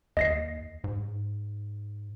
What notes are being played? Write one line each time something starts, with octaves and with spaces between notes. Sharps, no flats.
D#2 D#5 A#6 C7
G#2